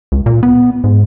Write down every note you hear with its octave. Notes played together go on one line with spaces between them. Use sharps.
C#2
A#2
B3
G#2